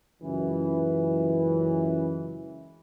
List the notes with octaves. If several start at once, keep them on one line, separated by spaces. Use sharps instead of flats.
C#2 F#2 E3